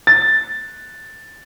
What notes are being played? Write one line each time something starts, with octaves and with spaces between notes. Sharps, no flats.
A6